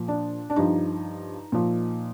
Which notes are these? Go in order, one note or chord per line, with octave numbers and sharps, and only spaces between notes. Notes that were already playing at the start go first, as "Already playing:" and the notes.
Already playing: A#2 F3
D4
D4
G2 F3 D#4
A#2 F3